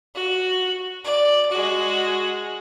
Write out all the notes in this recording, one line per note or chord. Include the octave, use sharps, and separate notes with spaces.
F#4
D5
G#3 F#4